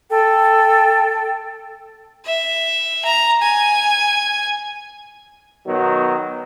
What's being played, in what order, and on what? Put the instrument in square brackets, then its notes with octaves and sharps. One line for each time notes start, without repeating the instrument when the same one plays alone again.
[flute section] A4 G5
[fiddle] E5
A#5
G#5
[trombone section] B2 D#3 F#3